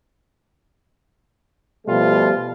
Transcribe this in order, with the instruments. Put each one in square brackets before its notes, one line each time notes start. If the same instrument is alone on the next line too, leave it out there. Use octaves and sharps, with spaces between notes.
[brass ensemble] B2 F3 G3 A3 F4